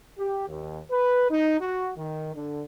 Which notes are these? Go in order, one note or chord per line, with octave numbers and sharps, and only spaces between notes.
G4
D#2
B4
D#4
F#4
D#3
D3